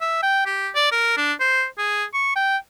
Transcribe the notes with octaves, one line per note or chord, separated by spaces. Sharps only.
E5
G5
G4
D5
A#4
D4
C5
G#4
C#6
G5